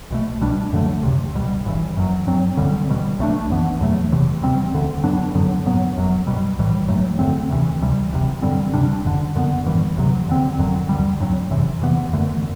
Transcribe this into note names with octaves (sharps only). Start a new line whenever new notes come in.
B1 B2 A3
C2 B2 G3 D4
F#2 D3 F#3 A3
E1 D2 C3
C2 B2 G3
G1 G2 E3
F#1 F#2 F#3
G2 F#3 C4
D2 D3 G3 C4
E1 E2 B2 G3
B1 B2 A3 D4
F#2 E3 B3
E2 B2 F#3 A3
F#1 E2 C3 E3
D2 C3 G3 C4
E1 D2 D3
G2 F#3 B3 D4
F#2 D3 F#3 B3
B1 A2 F#3 B3
F#1 F#2 F#3
B1 B2 G3
B1 A2 E3 G3
A1 G2 F#3 A3
E2 D3 A3 C4
D2 C3 E3
D2 C3 G3
F#1 E2 C3
G2 D3 G3 C4
D2 C3 G3 D4
F#1 F#2 D3
F#2 D3 F#3 B3
A1 G2 E3 G3
E1 D2 C3 F#3
E2 D3 A3 C4
G1 F#2 D3 F#3
D2 D3 G3
G2 F#3 A3 C4
F#1 E2 C3 E3
E2 C3 E3 B3
F#2 D3 A3